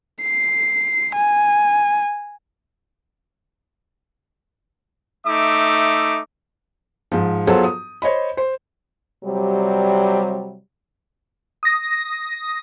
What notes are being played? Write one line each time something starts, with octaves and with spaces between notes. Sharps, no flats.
C7
G#5
A3 D#4 E5 D6
G#2 F3
F#3 B3 F4 G#4 A4 C5
D#6
C5 C#5 D#5 B5
C5
C3 F#3 G3
D#6 A#6